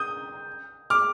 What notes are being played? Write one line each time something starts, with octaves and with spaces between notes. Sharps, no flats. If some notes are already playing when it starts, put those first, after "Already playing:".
Already playing: D#6 G6
D6 F6